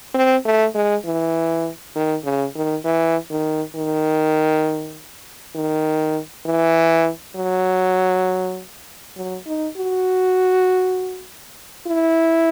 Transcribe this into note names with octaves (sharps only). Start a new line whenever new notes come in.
C4
A3
G#3
E3
D#3
C#3
D#3
E3
D#3
D#3
D#3
E3
F#3
F#3
D#4
F#4
E4